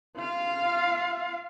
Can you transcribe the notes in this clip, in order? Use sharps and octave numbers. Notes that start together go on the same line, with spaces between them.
F4 F5